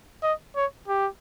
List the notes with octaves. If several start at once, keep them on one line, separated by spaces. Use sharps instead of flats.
D#5
C#5
G4